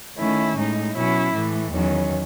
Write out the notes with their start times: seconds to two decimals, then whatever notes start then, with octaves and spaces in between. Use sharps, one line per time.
0.18 D#3 A3 C#4 E4
0.57 A2 G#3 D#4
0.95 B2 F#3 C#4 E4
1.34 A2 E3 A3
1.73 E2 D#3 F#3 C#4